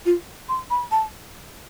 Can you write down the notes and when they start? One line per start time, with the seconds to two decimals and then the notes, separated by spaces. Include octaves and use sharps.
0.06 F4
0.49 C6
0.70 B5
0.92 A5